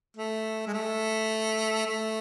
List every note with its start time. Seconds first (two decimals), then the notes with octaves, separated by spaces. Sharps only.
0.17 A3
0.67 G#3
0.73 A3
1.86 A3